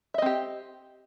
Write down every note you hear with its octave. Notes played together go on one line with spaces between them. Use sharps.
C4 G4 D#5 E5